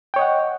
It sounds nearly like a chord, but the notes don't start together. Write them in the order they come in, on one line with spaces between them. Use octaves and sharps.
G5 C#5 D#5 F#5